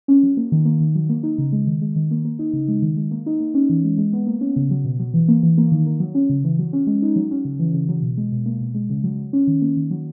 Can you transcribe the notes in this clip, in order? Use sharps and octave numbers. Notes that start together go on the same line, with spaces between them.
C#4
F#3
A#3
D#3
A#3
D#3
F#3
A#3
D#4
C#3
G#3
D#3
G#3
D#3
A#3
A#3
D#4
C#3
G#3
D#3
G#3
A#3
D#4
A#3
C#4
E3
G#3
G#3
B3
A#3
C#4
C#3
F#3
B2
F#3
E3
A#3
E3
A#3
D#3
A#3
F#3
C#4
C#3
E3
F#3
C#4
G#3
D#4
F#3
C#4
C#3
E3
C#3
F#3
B2
G#3
B2
A#3
B2
G#3
C#3
F#3
F#3
C#4
D#3
A#3
D#3
F#3